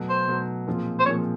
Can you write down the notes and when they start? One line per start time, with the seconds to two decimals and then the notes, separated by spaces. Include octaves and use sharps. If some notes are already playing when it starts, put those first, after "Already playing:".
Already playing: B2 F#3 A3
0.09 C5
0.28 B2 F#3 A3
0.67 A#2 F3 G#3 C4 F4
0.99 C5
1.05 A#2 F3 G#3 C4 F4 C#5